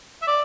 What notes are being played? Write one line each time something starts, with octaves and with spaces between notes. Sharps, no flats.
E5
D5